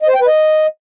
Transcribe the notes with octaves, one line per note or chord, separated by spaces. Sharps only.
D#5
C5
G5
B4
D#5